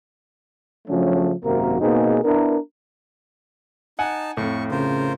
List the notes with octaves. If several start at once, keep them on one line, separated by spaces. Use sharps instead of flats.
C#3 F3 F#3 A3 C#4 D4
G#1 F#2 C3 A#3 F#4 A#4
B2 A#3 C4 D#4 G#4
B3 D4 E4 A#4
D#4 F#5 G#5 A5
F2 A2 C#6
C#3 F4 A#4 C5